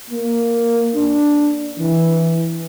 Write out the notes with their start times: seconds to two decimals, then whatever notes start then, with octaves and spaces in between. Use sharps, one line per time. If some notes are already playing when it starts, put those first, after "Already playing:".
0.10 A#3
0.96 D4
1.79 E3